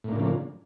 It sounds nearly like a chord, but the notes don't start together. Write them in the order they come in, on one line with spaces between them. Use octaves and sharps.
A2 A#3 D4 C#3 F3